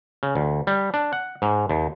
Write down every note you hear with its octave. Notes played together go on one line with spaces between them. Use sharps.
C#3
D2
G3
D4
F#5
G#2
D#2